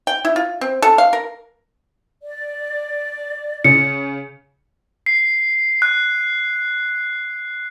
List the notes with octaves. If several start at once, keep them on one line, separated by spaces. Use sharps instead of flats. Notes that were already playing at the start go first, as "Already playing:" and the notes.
G5
E4
F4
C4
A4
F5
A#4
D5
C#3 C#7
C7
F#6